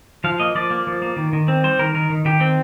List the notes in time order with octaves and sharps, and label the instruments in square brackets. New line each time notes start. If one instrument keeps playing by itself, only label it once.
[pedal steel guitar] F3 F5
A#3 D#5
F3 D5
A#3
F3
A#3
D#3
D#3
C4
G3 C5
D#3 A#4
D#3 A#4
D#3
D#3 G4
C4